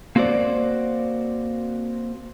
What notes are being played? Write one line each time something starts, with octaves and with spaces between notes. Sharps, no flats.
A#3 C4 F#4 C5 D5